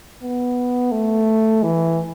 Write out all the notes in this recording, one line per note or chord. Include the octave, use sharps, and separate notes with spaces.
B3
A3
E3